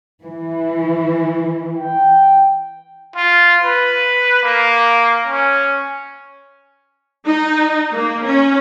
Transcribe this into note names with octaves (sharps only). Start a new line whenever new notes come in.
E3
G5
F4
B4
A#3
C#4
D#4
A#3
C#4